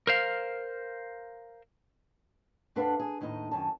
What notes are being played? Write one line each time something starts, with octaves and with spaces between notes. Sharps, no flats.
A#4 C5 F5
F2 D4 A4 B4 F5 F#5
G#4
D#2 A2 D#4 D#5
F#2 D#3 G#5 A5